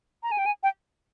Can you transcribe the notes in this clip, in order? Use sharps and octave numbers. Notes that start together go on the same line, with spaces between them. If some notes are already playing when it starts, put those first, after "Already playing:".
A#5
G#5
G5
G#5
G5